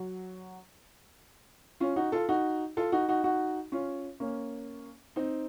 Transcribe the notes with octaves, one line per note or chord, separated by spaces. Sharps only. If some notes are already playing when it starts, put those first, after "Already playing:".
Already playing: F#3
C#4 F4
D#4 F#4
F4 A4
D#4 F#4
F4 A4
D#4 F#4
D#4 F#4
D#4 F#4
C#4 F4
A#3 C#4
C4 D#4